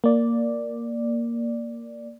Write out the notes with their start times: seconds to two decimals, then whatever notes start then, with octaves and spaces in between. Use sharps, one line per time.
0.04 A#3 D5